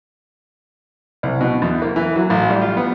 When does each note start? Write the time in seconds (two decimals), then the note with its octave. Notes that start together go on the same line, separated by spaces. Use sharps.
1.23 C2
1.41 B2
1.62 E2
1.82 A#3
1.96 E3
2.16 F#3
2.30 A1
2.50 G3
2.61 F4
2.77 B3